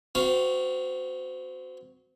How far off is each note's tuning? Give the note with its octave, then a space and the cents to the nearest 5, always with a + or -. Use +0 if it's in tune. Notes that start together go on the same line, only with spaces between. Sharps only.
C4 -30 F#4 -5 F5 +0